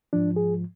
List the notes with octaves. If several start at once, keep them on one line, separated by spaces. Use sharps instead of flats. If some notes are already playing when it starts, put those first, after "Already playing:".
G#2 F3 D4
G#4